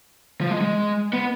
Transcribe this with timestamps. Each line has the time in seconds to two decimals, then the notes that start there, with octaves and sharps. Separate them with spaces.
0.41 F3
0.51 G#3
0.61 G#3
1.13 B3